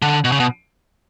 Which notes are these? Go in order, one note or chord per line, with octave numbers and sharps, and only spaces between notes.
D3
B2
C#3
B2